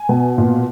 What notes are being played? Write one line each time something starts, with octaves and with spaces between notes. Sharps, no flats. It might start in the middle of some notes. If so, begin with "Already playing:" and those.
Already playing: G#5
B2
A#2